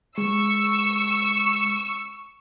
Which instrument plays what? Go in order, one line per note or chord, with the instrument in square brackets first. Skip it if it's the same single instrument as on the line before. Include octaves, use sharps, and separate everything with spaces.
[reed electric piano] G#3 [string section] C#6 E6